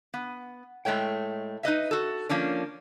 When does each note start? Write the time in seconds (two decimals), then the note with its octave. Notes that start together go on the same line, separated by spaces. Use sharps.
0.14 B3
0.85 A2 G#3 A3 C#5 G5
1.63 D#4 B4 D#5 E5
1.91 F#4 A4
2.29 F3 A#3 C#4 D4